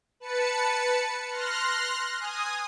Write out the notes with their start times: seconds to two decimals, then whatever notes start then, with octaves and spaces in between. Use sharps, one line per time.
0.20 B4 A5 C#7
1.30 C6 F6 F#6 A#6
2.18 G#5 D#6